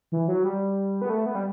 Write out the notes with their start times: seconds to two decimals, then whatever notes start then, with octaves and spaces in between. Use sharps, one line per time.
0.12 E3
0.28 F#3
0.44 G3
1.02 B3
1.10 A3
1.26 B3
1.35 G3